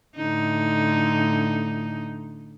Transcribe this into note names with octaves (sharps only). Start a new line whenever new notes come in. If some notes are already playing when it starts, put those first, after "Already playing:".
A2 D3 D#4